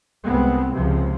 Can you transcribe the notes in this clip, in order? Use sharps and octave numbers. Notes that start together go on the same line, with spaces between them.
C2 G#3 B3 C4
C#2 C3 F3